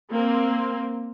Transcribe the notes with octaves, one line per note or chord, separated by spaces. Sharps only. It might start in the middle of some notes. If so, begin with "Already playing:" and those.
A#3 C4